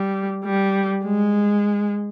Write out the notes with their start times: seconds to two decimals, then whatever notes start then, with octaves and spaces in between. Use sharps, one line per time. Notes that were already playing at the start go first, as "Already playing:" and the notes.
Already playing: G3
0.44 G3
1.04 G#3